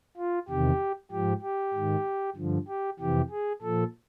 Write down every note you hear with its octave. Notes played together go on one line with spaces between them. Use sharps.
F4
E2 C3 D#3 G4
G#2 F3 G4
G4
G#2 D#3
G2 D3 F3
G4
F2 C3 E3 G4
G#4
A#2 F3 A4